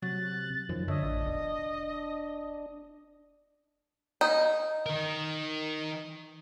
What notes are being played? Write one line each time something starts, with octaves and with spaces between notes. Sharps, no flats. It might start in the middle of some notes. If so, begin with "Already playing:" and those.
C3 F#3 F#6 A6
F#2 D#3 F3
D3 C#5 D#5 E5
A1 D4
E1
D#4
D#3 A#4